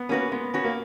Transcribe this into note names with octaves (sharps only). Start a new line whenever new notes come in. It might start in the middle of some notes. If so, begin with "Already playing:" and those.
Already playing: B3
A#3 C#4 F#4 B4
G#3 B3
C#4 F#4 B4
A#3